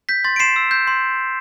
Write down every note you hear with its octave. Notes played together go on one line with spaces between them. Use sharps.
G6 B6
C6 A6
D7
C6 C7 E7
E6
G6
C6